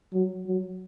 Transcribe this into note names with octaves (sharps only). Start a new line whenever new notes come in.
F#3
F#3